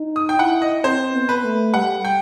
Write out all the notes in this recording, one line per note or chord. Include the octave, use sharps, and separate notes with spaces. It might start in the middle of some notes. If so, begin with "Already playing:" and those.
Already playing: D#4
D#6
G5
E4 F#5
D#5
C4 C5
B3
B4
A3
G3 F#5
G5